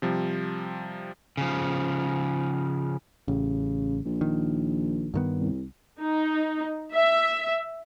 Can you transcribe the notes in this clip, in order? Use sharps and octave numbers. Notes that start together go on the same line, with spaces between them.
C3 F3 G3
C#3 F3
A1 C#3
A#1
D#3
G2 D#3 B3
C2
D#4
E5